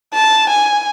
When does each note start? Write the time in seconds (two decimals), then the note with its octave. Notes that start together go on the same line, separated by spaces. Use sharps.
0.14 A5
0.50 G#5